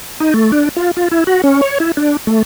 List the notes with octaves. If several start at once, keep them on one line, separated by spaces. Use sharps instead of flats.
D#4
A3
D4
F4
F4
E4
F#4
C#4
C#5
E4
D4
A3